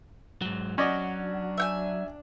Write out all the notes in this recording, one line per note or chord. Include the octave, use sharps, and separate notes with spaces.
G#2 F#3
F#3 C#4 D5 D#5 F#5
D4
E5 G5 G#5